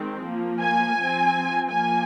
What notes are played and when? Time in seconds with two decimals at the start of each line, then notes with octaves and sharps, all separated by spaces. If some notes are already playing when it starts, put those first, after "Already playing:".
Already playing: D#3 G#3 C4
0.25 F3 A#3
0.62 G#5
0.98 F3 C4
1.70 F3 A#3 G#5